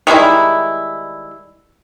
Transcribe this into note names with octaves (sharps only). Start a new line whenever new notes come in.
D#3 G3 G#3 E4